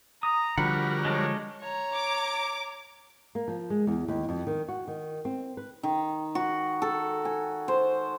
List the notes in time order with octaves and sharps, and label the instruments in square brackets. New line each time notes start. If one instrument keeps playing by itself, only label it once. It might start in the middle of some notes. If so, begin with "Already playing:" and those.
[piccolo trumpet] A#5 [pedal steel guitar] D#6
[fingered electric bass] D3 F3 [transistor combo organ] G3 F#4 A#4 [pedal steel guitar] F#5 [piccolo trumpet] B5
[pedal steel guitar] G#3 D4 [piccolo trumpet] C#5
[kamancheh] C#5 A#5
[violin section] D6
[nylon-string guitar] A#3
F3
G#3
E2
D#2
F2
D#3
F#4
D#3
C4
B4
[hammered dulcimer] D#3
F#4
A4
G#5
C5